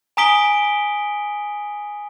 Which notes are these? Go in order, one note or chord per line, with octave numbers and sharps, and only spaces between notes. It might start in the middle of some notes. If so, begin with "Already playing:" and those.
G#5 A#5 D#6 B6 D7 G7